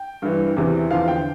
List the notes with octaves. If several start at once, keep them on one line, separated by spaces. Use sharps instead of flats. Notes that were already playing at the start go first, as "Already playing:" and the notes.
Already playing: G5
G2 E3
E2 C3 E3
E2 D3 F3 F5
G5